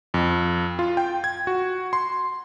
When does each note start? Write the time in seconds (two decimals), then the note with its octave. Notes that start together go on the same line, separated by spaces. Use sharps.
0.14 F2
0.79 F4
0.97 G5
1.24 G#6
1.47 F#4
1.93 C6